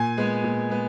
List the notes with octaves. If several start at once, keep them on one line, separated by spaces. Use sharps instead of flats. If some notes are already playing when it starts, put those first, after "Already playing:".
Already playing: A#2 G#5
G#3 B3
A#2
G#3 B3